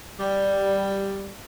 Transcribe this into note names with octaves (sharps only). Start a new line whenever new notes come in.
G3